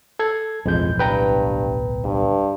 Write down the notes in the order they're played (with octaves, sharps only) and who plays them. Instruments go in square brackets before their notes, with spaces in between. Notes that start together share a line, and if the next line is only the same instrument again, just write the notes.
[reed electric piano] A4 G#6
[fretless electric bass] D1 B1 E3 [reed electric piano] F2 G#3 G6
[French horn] G2 [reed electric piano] B4 G5 A#5
[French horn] G2